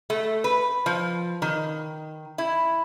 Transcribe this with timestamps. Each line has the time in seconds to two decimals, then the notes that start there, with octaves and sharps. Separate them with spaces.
0.10 A3
0.44 B4
0.86 F3
1.42 D#3
2.38 E4